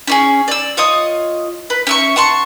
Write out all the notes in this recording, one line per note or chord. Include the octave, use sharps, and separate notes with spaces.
C#4 D#4 G#4
D5 E6
F4 C#5 D#5 D#6
B4
C#4 E5 C#6
F#5 A5 C6 C#6